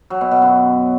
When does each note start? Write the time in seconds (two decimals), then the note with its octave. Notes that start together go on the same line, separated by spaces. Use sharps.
0.10 F#3
0.21 B2
0.31 B2
0.42 F#2